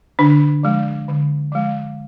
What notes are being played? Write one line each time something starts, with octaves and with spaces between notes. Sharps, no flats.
D3 D4
F3 G#3
D3
F3 G#3